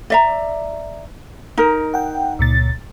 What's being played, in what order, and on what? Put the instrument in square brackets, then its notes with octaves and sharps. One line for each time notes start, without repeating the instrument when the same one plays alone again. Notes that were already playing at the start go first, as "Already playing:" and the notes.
[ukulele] D5 E5 A#5
D#4 A#4
[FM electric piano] F#5 G5
C#2 A#2 A6